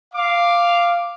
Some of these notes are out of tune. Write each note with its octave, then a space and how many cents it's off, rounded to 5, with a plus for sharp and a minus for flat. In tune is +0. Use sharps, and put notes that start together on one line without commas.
F5 -5 D6 +0